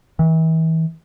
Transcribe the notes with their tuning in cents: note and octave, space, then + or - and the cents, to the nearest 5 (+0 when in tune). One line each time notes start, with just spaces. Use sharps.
E3 -35